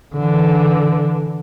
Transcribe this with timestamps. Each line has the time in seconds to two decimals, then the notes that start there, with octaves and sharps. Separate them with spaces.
0.15 D3 E3